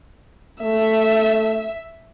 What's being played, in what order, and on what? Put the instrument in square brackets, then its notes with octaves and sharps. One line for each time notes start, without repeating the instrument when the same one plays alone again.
[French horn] A3 [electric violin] E5